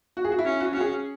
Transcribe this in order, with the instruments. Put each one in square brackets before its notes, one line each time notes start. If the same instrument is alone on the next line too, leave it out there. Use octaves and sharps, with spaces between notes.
[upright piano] F#4
G#4
F#4
E4
[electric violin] C#4
[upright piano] F#4
[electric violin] C#4 [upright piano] F#4
[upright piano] G#4